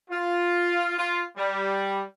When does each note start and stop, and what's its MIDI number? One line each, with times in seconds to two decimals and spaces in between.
0.11 0.92 65
0.97 1.23 65
1.37 2.01 55